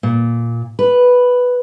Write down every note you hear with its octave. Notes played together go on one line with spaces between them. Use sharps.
A#2
B4